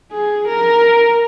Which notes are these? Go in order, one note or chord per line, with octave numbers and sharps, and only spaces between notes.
G#4
A#4